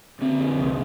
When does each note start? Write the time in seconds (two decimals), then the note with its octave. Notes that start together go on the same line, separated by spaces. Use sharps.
0.21 D3 C4
0.40 F2
0.58 C2